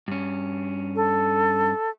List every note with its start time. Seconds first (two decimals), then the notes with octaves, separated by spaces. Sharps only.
0.08 G2 C#4
0.96 A4